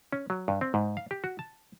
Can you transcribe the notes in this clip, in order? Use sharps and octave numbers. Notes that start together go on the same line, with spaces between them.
C#4
F#3
G2
C4
G#2
F5
G4
F#4
A5